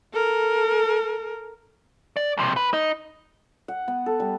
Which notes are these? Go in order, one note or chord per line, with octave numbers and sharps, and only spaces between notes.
A4 A#4
D5
B1 C3
B4
D#4
F#5
B3
A4
G3